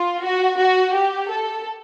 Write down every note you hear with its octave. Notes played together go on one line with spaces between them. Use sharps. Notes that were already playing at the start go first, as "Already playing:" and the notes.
Already playing: F4
F#4
F#4
G4
A4